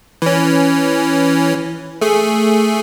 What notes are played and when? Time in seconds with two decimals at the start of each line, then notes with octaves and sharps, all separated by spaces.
0.22 E3 C#4
2.01 A3 G#4